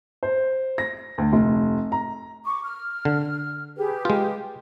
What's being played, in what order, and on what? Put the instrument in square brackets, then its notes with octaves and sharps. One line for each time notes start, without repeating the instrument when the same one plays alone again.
[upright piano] C5
A#6
D2
F1
A#5
[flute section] C#6 D6
F6
[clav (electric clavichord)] D3
[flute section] G4 G#4 B4
[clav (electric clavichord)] G#3 F4